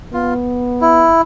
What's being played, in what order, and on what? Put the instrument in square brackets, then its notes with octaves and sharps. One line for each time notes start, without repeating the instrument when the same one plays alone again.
[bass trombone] B3 [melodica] F4
[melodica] E4